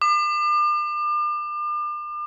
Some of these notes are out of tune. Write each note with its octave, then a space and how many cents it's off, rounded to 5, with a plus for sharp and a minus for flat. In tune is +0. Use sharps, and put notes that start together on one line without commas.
D6 +40